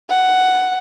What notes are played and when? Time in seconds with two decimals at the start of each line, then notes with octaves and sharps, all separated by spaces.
0.10 F#5